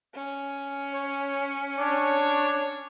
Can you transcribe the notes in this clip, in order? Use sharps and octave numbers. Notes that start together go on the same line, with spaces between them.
C#4
C#5
D4 C#5